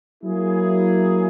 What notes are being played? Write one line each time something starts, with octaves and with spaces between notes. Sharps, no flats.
F#3 A#3 E4 G#4